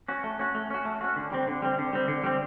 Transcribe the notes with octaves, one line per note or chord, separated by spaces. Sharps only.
C#4 F#4
A3
C#4 F#4
A3
C#4 F#4
A3
C#4 F#4
D3
G3 C4
D3
G3 C4
D3
G3 C4
D3
G3 C4